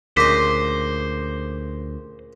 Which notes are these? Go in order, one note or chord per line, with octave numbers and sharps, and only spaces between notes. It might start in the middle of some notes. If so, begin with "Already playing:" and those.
D2 A#2 C#3 C5 D#5 D6 B6